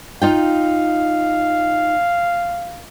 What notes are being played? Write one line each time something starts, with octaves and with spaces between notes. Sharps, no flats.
D#4 F4 F5 G5